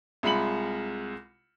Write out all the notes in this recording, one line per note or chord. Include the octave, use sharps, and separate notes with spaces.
C2 G#3 F4 B5 C#7 F#7